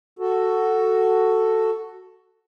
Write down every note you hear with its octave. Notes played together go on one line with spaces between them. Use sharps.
F#4 A4